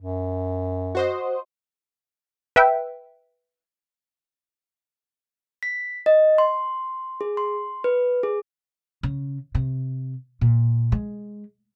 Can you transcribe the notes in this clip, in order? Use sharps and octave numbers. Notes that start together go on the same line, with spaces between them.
F#2
F#4 C5 D#5
B4 E5 G5
B6
D#5
C6
G#4
C6
B4
G#4
C#3
C3
A#2
G#3